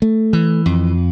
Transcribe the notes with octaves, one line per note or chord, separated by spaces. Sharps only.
A3
E3
F2